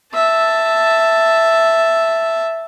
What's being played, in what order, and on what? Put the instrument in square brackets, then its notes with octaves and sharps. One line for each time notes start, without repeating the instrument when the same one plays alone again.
[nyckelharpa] E5 A5